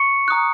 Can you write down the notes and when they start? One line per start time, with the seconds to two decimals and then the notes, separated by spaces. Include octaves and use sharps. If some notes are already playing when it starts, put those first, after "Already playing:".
Already playing: C#6 C#7
0.28 A#5 D#6 F#6